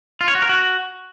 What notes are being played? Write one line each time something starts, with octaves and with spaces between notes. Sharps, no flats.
F4
C#5
F#4
A#4
F#4